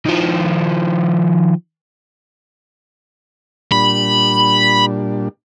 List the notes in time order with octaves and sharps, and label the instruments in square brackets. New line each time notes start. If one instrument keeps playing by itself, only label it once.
[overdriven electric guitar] D#3 F3
[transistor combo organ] A#2 G3 D4 [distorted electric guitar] B5